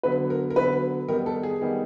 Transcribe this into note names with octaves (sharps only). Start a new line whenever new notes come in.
D3 F#3 B3 B4
A#4
A#4
D3 F#3 B3 B4
D#3 G3 B3 D#4 A#4
A4
G#4
D#3 G3 B3 D#4